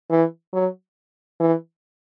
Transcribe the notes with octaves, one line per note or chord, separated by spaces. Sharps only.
E3
F#3
E3